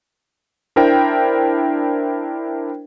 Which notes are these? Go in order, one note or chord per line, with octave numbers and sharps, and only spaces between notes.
D4 E4 A#4 C5 G5